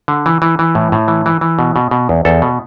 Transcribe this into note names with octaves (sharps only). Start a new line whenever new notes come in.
D3
E3
E3
E3
A2
A2
E3
E3
E3
B2
B2
B2
E2
E2 A4
B2